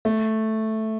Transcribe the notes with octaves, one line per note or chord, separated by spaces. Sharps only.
A3